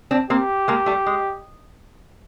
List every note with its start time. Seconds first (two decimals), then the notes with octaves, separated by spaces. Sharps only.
0.11 C4 D4
0.30 A#3 C4 G4
0.68 G#3 A#3
0.86 G3 A3
1.06 G#3